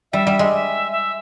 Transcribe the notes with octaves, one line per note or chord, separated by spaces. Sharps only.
G3 E5
G3
G#3
E5
E5